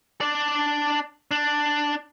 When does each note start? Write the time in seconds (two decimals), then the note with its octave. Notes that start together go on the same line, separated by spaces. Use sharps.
0.21 D4 D5
1.31 D4